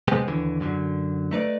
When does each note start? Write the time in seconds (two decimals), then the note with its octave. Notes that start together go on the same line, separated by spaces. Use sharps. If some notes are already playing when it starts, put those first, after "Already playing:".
0.08 C3 G#3 B3 C4 G4
0.28 D#2 D3 E3
0.60 F#2 D3 F#3
1.31 A3 D#4 B4 D5